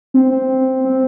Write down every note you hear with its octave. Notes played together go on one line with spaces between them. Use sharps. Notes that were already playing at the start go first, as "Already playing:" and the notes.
C4
C4
C4